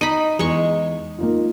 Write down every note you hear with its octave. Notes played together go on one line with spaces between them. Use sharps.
D#4 B5 D#7
E2 G#3 C#6
A#3 D#4 F4